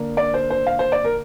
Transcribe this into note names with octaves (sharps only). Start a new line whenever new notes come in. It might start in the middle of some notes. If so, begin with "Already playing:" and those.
Already playing: D3 A#3 D4
D5
C5
C5
F5
C5
D5
A#4